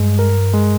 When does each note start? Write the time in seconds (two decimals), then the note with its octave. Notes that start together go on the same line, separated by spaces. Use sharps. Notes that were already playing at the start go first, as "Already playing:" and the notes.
Already playing: G2 G#3
0.19 A#4
0.54 G#3